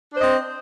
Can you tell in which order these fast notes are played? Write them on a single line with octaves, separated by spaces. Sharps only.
D4 C5 D#5 C4